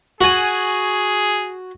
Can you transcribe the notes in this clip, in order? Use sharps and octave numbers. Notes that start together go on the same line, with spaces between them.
F#4 G#4 G#5